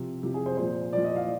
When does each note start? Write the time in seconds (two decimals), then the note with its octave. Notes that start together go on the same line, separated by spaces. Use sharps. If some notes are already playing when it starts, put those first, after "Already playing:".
Already playing: C3 F3
0.23 C3 F3 G4
0.34 G#4
0.46 C5
0.57 A#2 F3 C5
0.93 A#2 F3 D5
1.04 D#5
1.16 F5